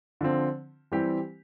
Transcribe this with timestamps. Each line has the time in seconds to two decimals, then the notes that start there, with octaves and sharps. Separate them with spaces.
0.21 D3 F3 C4
0.92 E3 G3 C4 G4